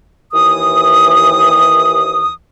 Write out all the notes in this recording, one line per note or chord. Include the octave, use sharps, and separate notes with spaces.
D#2 E3 D#6